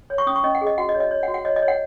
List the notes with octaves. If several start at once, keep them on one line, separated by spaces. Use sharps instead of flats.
C#5
C#6
C#4 D#6
C#6
C#4 D#5
F#5
G#4
D#5
F#4 F#5
D#5
C#5
D#5
C#5
F#5
F#4
F#5
C#5 D#5
D#5
C#5
F#5